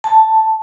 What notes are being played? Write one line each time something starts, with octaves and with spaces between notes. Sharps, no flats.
A5